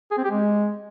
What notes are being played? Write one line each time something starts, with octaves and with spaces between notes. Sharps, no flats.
G#4
C4
G4
G#3